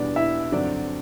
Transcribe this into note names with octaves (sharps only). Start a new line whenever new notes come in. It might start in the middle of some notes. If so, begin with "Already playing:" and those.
Already playing: E2 B2 G3 B3 D4 D5
E4 E5
G2 D3 F#3 C4 D4 D5